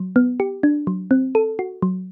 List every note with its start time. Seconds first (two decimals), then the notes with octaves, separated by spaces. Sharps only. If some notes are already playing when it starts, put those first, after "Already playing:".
Already playing: F#3
0.16 B3
0.40 G4
0.63 D4
0.87 F#3
1.11 C4
1.35 A4
1.59 F#4
1.82 F#3